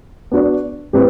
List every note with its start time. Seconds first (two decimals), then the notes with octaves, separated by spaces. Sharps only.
0.32 B3 D4 F#4 B4 D5
0.93 A2 G3 C4 G4 B4